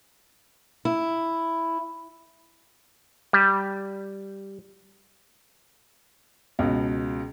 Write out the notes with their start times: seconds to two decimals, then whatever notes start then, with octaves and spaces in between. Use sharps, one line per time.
0.85 E4
3.33 G3
6.59 C#2 B2